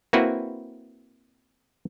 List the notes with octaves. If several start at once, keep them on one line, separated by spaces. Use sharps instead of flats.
A#3 C4 E4 F#4 B4